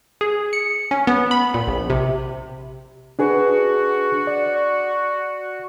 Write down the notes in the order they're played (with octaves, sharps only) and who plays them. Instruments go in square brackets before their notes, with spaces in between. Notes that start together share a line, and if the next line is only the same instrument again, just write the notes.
[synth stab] G#4
C#7
C#4
B3
B5
A#2
A#1
C3
[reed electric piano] D4 G#4 B4 [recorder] F#4
[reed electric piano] D5